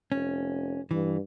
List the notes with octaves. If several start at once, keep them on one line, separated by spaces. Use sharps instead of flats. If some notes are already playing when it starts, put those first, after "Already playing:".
F1 C#4
G2 E3